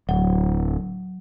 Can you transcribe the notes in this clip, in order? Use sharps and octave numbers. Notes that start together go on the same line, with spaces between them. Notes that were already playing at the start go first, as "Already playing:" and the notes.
D1 F#3